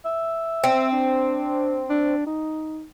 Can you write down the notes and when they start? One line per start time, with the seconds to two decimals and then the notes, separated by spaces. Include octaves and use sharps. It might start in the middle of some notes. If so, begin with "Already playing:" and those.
0.05 E5
0.64 C4
0.92 D4
1.90 D4
2.27 D#4